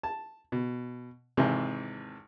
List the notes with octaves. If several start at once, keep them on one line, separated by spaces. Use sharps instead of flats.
A5
B2
G#1 C3 E3